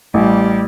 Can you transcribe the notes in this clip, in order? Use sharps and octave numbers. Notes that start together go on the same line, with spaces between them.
A1 G3